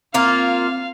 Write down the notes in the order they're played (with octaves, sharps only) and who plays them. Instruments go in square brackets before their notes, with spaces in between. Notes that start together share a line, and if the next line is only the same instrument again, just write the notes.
[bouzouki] A#3 F4 [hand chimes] C4 F6 [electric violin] F5